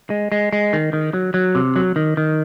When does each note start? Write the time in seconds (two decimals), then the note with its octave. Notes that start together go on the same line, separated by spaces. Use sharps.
0.10 G#3
0.32 G#3
0.53 G#3
0.73 D#3
0.93 D#3
1.14 F#3
1.34 F#3
1.55 C3
1.76 F#3
1.96 D#3
2.17 D#3